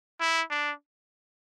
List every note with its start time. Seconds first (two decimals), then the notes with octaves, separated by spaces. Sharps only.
0.20 E4
0.50 D4